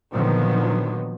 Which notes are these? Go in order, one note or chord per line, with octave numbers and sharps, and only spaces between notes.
A#2 D3 D#3 F3 F#3 B3